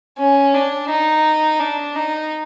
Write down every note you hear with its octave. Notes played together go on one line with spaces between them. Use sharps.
C#4
D4
D#4
D4
D#4